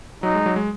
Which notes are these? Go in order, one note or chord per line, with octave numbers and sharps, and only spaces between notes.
F#3 D#4
G#3
F#3
G#3